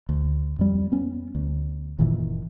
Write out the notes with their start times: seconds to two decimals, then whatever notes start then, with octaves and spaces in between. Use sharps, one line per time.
0.09 D2
0.59 F2 G3
0.92 B3 C#4
1.35 D2
1.99 F#1 A#2 D#3 E3